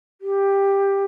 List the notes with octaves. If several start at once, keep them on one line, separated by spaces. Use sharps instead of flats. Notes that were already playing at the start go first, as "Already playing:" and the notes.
G4